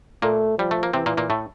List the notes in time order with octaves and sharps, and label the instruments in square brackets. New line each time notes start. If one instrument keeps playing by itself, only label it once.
[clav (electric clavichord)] A#2 A#3 [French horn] A3
[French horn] F3 [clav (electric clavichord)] G3
[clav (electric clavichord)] A3
A#3
[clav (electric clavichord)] C3 C4 [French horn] E3
[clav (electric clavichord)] A#2 A#3
A#2 A#3
A2 A3